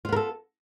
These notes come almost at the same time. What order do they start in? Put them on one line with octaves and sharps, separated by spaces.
F4 B3 A#4 A4